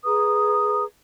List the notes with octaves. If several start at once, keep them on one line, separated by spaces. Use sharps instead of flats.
G#4 B4 A#5 D#6